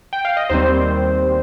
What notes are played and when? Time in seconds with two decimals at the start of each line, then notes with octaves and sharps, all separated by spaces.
0.13 G5
0.25 F5
0.37 D#5
0.50 D#2 D#3 G3 C4 C5